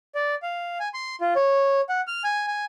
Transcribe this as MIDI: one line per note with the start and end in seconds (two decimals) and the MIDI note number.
0.15 0.35 74
0.43 0.78 77
0.80 0.89 80
0.94 1.16 84
1.21 1.34 65
1.36 1.81 73
1.89 2.01 78
2.07 2.23 89
2.24 2.47 80
2.48 2.65 80